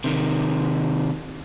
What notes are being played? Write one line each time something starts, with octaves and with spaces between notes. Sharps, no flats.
C3 D#3